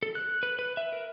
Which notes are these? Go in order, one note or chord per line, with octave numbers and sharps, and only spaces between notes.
A4
F#6
B4
B4
E5
A#4